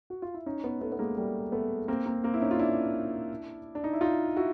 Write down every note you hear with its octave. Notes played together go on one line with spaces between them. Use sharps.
F#4
F4
E4
C#4 D#4
B3 C#4
A3 B3
B3
G#3 A#3
G3 A3
A3 B3
A#3 C4
A#3 C4
A#3 C4
E4
C#4 D#4
F4
D4 E4
D4
D#4
E4
D#4 F4
E4 F#4